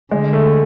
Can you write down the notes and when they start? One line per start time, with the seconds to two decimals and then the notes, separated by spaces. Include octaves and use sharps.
0.11 D3 G#3
0.33 A3